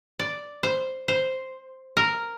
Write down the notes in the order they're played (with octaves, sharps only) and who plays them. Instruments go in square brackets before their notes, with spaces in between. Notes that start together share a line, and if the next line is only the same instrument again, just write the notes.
[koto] D5
C5
C5
A#4